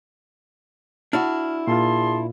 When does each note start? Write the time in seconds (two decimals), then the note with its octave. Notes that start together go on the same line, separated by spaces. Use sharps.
1.13 D4 E4 F#4 F6
1.68 A#2 F4 G#4 A5 C6